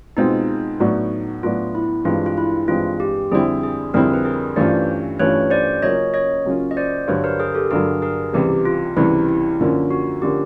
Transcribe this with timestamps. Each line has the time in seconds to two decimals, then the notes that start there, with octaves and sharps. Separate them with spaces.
0.17 B2 G#3 C4 D#4 F4
0.80 A2 F#3 B3 D4 F#4
1.43 A2 F#3 B3 D4 F4 F#4
1.75 E4
2.05 G2 E3 G#3 C4 F4
2.26 F4
2.37 E4
2.68 G2 E3 G#3 C4 F4
3.00 G4
3.31 F2 D3 G3 C4 E4 G#4
3.63 G#4
3.94 F2 D3 G3 C4 E4 G#4 A#4
4.14 B4
4.25 G#4 A#4
4.56 G2 E3 A3 C#4 F4 C5 D5
5.19 G2 E3 A3 C#4 F4 B4 C#5
5.51 C5 D5
5.82 C#3 F#3 A#3 C#4 F4 C#5 D#5
6.14 C#5 D#5
6.45 C#3 F#3 A#3 C#4 F4
6.71 D#5
6.77 C5 D5
7.08 G2 D3 F#3 B4 C#5
7.24 A#4 C5
7.40 G#4 A#4
7.55 G4 A4
7.71 G2 D3 F#3 G#4 A#4
8.02 G#4 A#4
8.33 C#2 C3 E3 G3 G4
8.65 F4
8.97 C#2 C3 E3 G3 E4
9.29 E4
9.60 F#2 D3 F3 A#3 C#4
9.91 F#4
10.22 D3 F3 A#3 C#4 G4